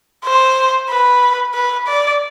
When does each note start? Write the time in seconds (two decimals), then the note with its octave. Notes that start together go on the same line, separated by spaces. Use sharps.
0.25 C5
0.90 B4
1.54 B4
1.87 D5